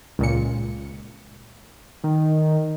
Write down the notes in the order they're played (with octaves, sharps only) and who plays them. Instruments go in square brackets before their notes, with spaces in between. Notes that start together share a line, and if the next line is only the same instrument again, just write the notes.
[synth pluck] C#2 A#2 C#7
[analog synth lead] D#3